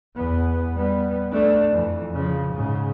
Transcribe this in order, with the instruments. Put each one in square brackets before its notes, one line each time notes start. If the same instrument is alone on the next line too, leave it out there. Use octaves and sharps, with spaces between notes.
[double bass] E2 B3
G3 B3
A3 D4
F2 E3
C#3 F3
G#2 C#3